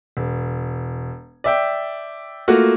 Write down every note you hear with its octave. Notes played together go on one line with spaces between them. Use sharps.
E1
D5 E5 G5
A3 A#3 F4 F#4